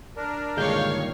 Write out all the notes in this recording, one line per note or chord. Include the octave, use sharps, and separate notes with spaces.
D4 A#4
G2 A#2 D3 D#3 G#3 C#5 F5 G6